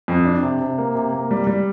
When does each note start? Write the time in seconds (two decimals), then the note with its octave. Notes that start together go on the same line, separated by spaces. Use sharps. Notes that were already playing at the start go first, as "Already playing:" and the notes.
0.08 F2
0.25 D4
0.43 C3
0.61 C3
0.78 A#3
0.95 C3
1.12 A#3
1.31 G3
1.47 G3